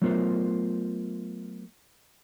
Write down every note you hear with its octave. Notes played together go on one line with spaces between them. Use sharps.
F#3 A3 B3 F4 A#4 C5